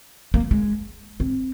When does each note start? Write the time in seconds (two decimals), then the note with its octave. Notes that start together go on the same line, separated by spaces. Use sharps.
0.34 A#3
0.51 G#3
1.20 C4